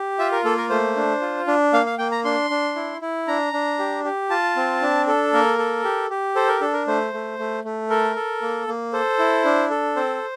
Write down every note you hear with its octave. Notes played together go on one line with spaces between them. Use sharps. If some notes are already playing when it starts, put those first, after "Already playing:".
Already playing: G4
F4 E5
A#4
A#3 A4
A#4
A3 C5
D4
F4
D4
A#3 F5
F5
A#3 G5
A#5
D4 C6
D4
E4
E4
D4 A#5
D4
G4
G4
F4 A5
C4
D4
A4
A#3 A#4
A4
G4
G4
A4 C5
A#4
D4 A4
A#4
A3 C5
A3
A3
A3
A4 A#4
A4
A#3
A#3
A4 C5
E4
D4
A4
C4 C5